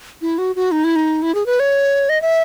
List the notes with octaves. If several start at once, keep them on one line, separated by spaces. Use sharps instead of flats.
E4
F#4
F#4
D#4
E4
D#4
E4
G#4
B4
C#5
D#5
E5